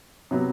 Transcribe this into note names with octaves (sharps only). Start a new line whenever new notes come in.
C3 F#3 B3